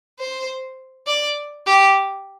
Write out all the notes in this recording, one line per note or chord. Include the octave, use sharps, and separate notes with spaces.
C5
D5
G4